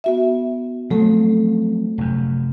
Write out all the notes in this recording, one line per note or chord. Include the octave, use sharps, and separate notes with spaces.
B3 F#4 E5
F3 F#3 A3 C4 A4
F1 F#2